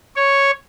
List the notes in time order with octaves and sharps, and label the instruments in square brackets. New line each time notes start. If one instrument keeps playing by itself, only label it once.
[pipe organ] C#5